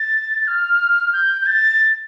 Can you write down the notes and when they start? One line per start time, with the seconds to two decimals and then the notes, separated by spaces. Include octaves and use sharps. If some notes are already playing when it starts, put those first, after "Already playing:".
Already playing: A6
0.47 F6
1.13 G6
1.42 G6
1.46 A6